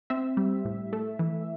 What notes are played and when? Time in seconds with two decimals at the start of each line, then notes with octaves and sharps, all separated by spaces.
0.10 C4 E5
0.37 G3
0.65 A2
0.93 A3
1.19 E3